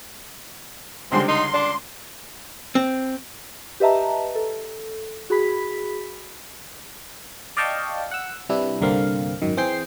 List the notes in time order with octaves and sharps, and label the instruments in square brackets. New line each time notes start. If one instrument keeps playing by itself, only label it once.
[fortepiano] C#2 D3 G3 [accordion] G#3 C6 [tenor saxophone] C4
[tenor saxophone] D#4 [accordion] C6
[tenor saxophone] D4
[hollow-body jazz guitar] C4
[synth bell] G4 B4 D#5 E5 A5 A#5
A4
F#4 G#4 B5 B6
[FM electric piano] D5 D#5 F5 G5 A5 C#6
F#5 E6
C3 G3 D4 E4 B4
C2 G2 D3 A#3 C4 F5
G#1 F#2 D#3
E3 C4 G#4 G5 C7